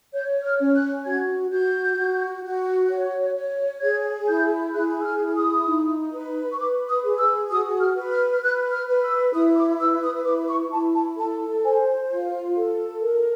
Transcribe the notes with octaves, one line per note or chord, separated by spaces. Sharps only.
C#5 G6
F6
C#4
F#6
F#4 G#6
F#4 G6
F#4
F#4
C#5
C#5
G#4 G#6
E4 G6
G#4 F#6
E6
F6
E4
D#6
D#4
B4
C#6
B4 D6
D#6
G#4
E6
F#4 D#6
F6
B4
F6
F6
B4 F#6
F6
B4
E6
E4 D#6
D6
B4 E6
D#6
E4 D6
C#6
E4 A5
A5
A4 A5
C5 G#5
F4
A4
A#4